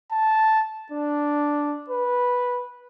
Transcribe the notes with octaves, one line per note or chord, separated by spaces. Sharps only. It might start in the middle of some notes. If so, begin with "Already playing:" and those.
A5
D4
B4